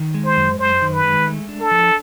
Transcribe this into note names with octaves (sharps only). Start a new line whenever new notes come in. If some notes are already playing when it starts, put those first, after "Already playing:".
Already playing: D#3
G#3
C5
F#2
F#2 C5
D#3
B4
G#3
A3
D4
A4
F3